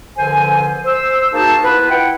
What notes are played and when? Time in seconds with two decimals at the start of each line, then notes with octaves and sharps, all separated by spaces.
0.17 C2 D3 F3 B4 C5 G#5
0.84 C5 E6
1.32 A#3 D#4 F#4 G#4 C5 A5
1.63 B3 E4 F4 B4
1.90 E4 F#5 G5